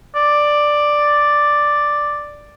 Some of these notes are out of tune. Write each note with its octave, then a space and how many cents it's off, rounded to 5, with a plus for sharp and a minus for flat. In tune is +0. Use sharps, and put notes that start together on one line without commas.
D5 +5